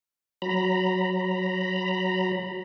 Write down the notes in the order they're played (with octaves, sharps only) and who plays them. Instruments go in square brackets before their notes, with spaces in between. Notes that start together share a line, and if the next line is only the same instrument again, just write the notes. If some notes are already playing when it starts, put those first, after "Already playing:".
[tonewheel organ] F#3 A#5 B5